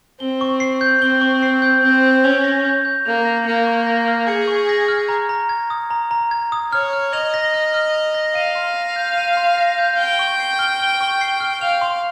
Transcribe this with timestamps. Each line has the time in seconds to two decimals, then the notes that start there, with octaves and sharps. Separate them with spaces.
0.20 C4 G7
0.41 C#6
0.60 C7
0.81 G6
1.01 C4 G7
1.22 C#6
1.43 C7
1.62 G6
1.83 C4 G6
2.03 G6
2.24 C#4 F7
2.44 A#6
2.65 G6
2.85 G6
3.06 A#3 F7
3.25 A#6
3.46 A#3 C#7
3.67 C#6
3.87 A#6
4.08 F6
4.27 G#4 C#7
4.47 C#6
4.69 A#6
4.88 F6
5.09 A#5
5.29 A#5
5.49 G#6
5.70 D#6
5.90 A#5
6.11 A#5
6.31 G#6
6.52 D#6
6.72 C#5 F6
6.93 F6
7.13 D#5 F7
7.34 A#6
7.54 F6
7.74 F6
7.94 F7
8.14 A#6
8.35 F5 D#7
8.55 C6
8.76 A#6
8.96 G6
9.17 D#7
9.37 C6
9.57 A#6
9.79 G6
9.98 G5 G7
10.19 C#6
10.40 C7
10.59 F6
10.80 G7
11.01 C#6
11.21 C7
11.40 F6
11.61 F5 F7
11.81 C6